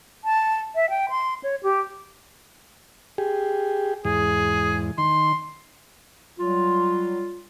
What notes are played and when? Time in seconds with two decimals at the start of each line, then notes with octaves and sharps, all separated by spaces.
0.24 A5
0.75 E5
0.90 G5
1.10 C6
1.43 C#5
1.63 G4
3.18 G4 G#4
4.05 E2 G#2 G#4
4.98 D#3 C6
6.38 F#3 G3 F4